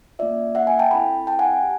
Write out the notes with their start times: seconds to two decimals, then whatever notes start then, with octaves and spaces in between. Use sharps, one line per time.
0.19 A#3 C#4 F4 D5 E5
0.55 E5 F#5
0.67 F#5 G#5
0.79 G5 A5
0.91 C4 E4 A4 A5 B5
1.27 G5 A5
1.39 F#5 G#5
1.63 G4